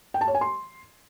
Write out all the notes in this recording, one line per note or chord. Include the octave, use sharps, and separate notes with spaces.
G5
A5
C#5
G#5
C6